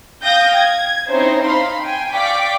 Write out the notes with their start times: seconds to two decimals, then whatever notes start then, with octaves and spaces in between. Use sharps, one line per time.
0.23 F5 G5 D#6 G6 A#6
0.56 G#6
1.07 C4 C#4 D#4 E4 C5
1.45 D#4 F5 B5 C6
1.81 G5 G#5
2.13 D5 F5 G5 C#6 D6 B6